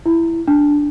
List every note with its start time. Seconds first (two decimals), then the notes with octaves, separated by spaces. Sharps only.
0.06 E4
0.48 D4